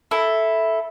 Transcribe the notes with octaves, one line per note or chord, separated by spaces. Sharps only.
E4 A4